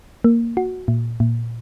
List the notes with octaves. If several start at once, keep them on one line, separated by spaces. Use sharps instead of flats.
A#3
F#4
A#2
A#2